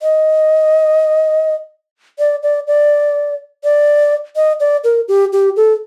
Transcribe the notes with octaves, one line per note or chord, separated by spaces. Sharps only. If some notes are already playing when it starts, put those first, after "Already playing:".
D#5
D5
D5
D5
D5
D#5
D5
A#4
G4
G4
A4